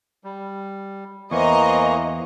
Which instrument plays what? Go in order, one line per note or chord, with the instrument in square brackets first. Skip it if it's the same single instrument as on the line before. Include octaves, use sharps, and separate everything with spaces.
[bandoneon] G3
[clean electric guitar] E2 [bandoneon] E3 A#3 C#6 [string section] C5 D#5 A#5